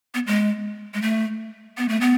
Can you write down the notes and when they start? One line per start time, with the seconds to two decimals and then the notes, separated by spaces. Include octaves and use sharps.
0.14 B3
0.27 G#3
0.94 G#3
1.02 A3
1.78 B3
1.89 A3
2.01 B3